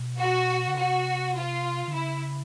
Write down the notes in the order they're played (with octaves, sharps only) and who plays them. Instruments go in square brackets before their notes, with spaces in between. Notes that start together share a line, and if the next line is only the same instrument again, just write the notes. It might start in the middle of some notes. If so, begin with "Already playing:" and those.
Already playing: [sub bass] B2
[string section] F#4
[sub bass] C#3
[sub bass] C3 [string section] F#4
[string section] F4
[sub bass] D3
[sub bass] C#3 [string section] E4